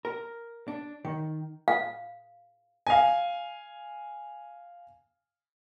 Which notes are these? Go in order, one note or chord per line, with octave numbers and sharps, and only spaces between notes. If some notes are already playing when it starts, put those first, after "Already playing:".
A#4
D4
D#3
F5
F5 G#5